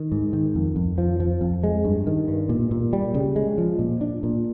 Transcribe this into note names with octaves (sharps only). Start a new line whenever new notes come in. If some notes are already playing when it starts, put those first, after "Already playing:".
Already playing: D#3
G#2
D#3
F2
F2
F3
F3
F2
G#3
G2
D#3
G2
A#2
A#2
G3
C#3
G#3
F3
A#2
D4
A#2